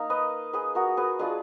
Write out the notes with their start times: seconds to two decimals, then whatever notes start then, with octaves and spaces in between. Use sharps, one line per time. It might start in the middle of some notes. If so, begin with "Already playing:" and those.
Already playing: A#3 D#4 F5
0.10 B4 D#5
0.53 G#4 B4
0.75 F#4 A#4
0.97 G#4 B4
1.19 G#3 D4 F4 G#4 B4